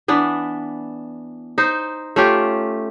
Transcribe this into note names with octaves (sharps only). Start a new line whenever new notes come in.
E3 B3 D4
D#4 C5
A3 C#4 F4 G4